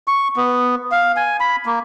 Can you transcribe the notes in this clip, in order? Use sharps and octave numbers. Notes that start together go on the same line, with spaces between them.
C#6
B3
F5
G#5
B5
A#3